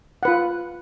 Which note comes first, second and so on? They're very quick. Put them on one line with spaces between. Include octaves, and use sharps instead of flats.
F#5 B4 F4